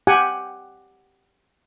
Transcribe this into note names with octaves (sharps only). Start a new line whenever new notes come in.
G4 F#5 G#5